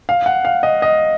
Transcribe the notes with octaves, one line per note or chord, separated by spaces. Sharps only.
F5
F#5
F5
D#5
D#5